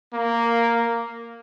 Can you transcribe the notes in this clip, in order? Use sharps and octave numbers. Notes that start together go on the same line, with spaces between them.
A#3